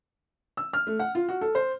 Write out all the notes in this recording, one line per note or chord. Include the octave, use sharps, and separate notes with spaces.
E6
F6
A3
F#5
F4
F#4
A4
C5